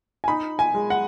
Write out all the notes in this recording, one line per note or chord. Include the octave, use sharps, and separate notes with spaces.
G#5
D#4 B5
G#5
G#3
F#5